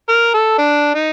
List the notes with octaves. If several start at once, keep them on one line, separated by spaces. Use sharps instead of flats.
A#4
A4
D4
D#4